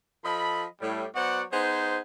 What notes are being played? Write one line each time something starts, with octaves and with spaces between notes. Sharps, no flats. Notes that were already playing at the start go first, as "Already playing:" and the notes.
F3 A4 D#5 B5
A2 G3
F#3 B3 F#4 C5 D5 F#5
B3 D#4 G#4 C5